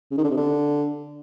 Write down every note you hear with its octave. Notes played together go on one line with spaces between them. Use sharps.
C#3
D#3
D3
C3
D3